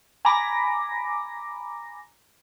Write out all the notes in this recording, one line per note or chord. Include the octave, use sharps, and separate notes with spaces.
G#5 A#5 B5 D6 A#6